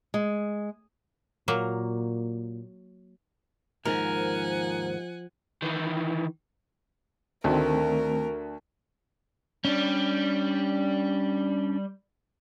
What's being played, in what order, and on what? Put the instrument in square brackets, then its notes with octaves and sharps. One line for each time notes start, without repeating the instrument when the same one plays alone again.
[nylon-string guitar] G#3
[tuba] A#2 [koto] F#3 A#3
[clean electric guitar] D#2 G#2 [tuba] F3 [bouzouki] A#4 [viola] F#5 G#5
[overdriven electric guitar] D#3 E3
[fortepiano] D2 [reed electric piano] D#3 A3 C4 [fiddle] A#4
[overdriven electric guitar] G3 [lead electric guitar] C#4 D4